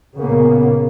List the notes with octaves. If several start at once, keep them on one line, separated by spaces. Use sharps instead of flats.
C#2 A#2 C#3 A#3 B3